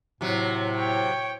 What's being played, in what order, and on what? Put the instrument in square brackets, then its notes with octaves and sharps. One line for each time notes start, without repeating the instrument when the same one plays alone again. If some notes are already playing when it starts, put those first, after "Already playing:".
[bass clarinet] A2 [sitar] C3 F#3
[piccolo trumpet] C#5 [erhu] G5